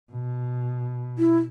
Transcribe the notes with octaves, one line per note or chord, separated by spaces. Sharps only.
B2
E4